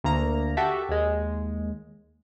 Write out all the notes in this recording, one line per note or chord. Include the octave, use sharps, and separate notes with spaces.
D2 A#3 A#5
F#4 G4 A4 E5
D#2 G#3